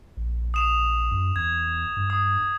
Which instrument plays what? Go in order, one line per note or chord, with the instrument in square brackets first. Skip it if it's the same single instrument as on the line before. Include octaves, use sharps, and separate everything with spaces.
[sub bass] A#1
[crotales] D#6 E7 F7
[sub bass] F#2
[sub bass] E2 [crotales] G#6
[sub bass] G2
[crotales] D#6